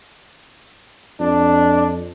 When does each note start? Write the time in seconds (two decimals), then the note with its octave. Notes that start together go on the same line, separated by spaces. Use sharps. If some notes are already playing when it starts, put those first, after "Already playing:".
1.20 F2 D4